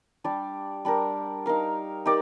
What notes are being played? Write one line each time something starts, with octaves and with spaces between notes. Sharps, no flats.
G3 D4 G4 D5
G3 D4 G4 A#4
D#4 A#4 F5
D#4 G4 A#4 D5